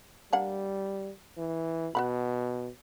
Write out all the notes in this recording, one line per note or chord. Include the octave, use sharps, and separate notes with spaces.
G3 A#3 D4 F#5
E3
B2 F#4 F#5 B5